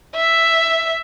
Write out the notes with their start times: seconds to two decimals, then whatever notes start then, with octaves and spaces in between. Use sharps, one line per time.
0.15 E5